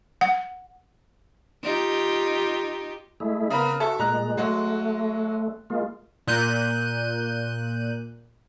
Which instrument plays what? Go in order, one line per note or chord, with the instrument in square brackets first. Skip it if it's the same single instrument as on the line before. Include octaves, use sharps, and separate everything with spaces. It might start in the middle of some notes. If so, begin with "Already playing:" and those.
[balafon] F#5
[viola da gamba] D#4 F4 G4
[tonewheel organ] G#3 A3 E4
[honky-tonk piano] C#3 A#4 B4 [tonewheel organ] B3
[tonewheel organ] F#4 [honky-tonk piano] A4 E5
[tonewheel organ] A#2 G#3 [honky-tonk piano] A#5 F#6
[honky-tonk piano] F#3 G#3 F#4 [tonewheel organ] A3
[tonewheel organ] G#3 A#3 F4
[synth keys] A#2 F#6 G6 D#7